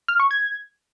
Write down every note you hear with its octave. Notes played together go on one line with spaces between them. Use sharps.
F6
C#6
G#6